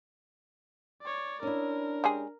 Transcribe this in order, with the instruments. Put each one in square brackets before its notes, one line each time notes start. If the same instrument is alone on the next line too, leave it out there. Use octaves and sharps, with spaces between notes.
[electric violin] C#5 D5
[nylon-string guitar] C#4 E4 [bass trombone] D4 [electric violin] A#4
[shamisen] G#3 G4 G#4